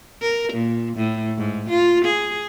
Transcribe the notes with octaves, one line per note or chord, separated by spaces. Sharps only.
A#4
A#2
A2
G#2
F4
G#4